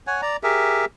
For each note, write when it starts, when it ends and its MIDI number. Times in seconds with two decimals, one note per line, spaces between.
0.07 0.21 73
0.07 0.21 78
0.07 0.21 80
0.22 0.37 74
0.22 0.37 82
0.43 0.85 67
0.43 0.85 68
0.43 0.85 70
0.43 0.85 76